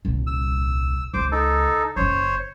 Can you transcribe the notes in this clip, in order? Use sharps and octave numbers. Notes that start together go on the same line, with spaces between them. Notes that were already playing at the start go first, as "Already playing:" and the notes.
D#1 C2
E6
C#2 C#3 C5 D6
D#4 A4
F#1 C#3 C5 C#5